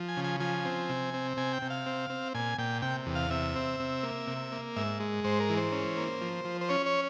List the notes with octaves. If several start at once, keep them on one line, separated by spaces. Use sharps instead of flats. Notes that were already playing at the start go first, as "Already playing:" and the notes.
Already playing: F3
G#5
C#3
G#5
F3 G#5
C4
C3
C4
C3 G#5
G5
C3
F5
C4
C4
A#2 G#5
A#2 G5
C3 G5
E2
F5
C3 E5
C4
C3
A#3
C3
A#3
G#2 E5
G#3
G#2 C5
A#4
E3
C5
C#4
A#3
F3
F3
C5
C#4 C#5
C#5